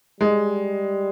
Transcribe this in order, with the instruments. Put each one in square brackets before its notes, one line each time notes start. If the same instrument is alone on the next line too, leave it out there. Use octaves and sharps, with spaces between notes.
[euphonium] G3 [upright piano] G#3